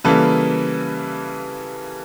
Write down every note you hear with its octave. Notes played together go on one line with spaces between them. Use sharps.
C#3 E3 G3 A#3 A4 B4